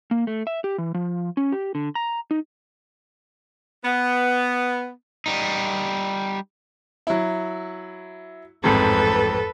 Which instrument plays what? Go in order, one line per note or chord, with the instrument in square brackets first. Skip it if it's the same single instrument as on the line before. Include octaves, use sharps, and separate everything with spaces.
[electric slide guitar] A#3
A3
E5
G4
E3
F3
C#4
G4
D3
A#5
D#4
[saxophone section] B3
[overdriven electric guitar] G3 D#4
[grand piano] F#3 E4
[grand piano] A1 F2 G#2 [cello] A4 B4